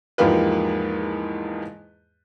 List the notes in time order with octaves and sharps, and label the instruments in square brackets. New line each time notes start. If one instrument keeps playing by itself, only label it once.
[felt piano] E2 G#2 F3 A#3 G4 B4